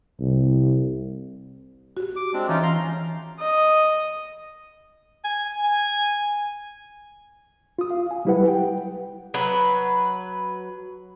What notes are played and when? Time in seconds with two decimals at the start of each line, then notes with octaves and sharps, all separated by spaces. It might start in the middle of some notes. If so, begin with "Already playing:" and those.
0.20 C2
1.97 F#4 G4
2.16 D6
2.33 G#3 C4 D4
2.49 E3 C#4 D#4 F4
2.63 A#5 C6
3.39 D#5
5.24 G#5
5.64 G#5
7.79 F4 D#6
7.91 F5
8.11 G#5
8.25 F#3 G3 E4 G4 B4 F#5
8.48 G5
9.34 F#3 B4